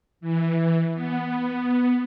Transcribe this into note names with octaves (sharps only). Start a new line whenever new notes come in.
E3
B3